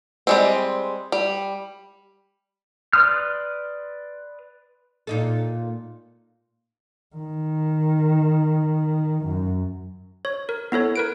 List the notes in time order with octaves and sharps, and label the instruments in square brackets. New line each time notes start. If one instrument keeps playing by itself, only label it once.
[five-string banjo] G3 G#3 C4
G3
[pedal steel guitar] B4 D5 C6 D#6 F6
[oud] A#2 D#4 A4
[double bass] D#3
F#2
[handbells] C#5
A#4
B3 E4 A4 C#5
A#4 B4 D7